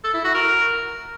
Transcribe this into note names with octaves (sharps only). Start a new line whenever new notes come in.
A4
E4
F#4
A#4